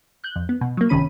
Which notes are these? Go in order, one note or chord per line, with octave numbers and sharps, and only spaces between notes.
F#6 G6
F2
B3
B2
F#3 A#3
G1 C3 D#3 C#4 B5 D#7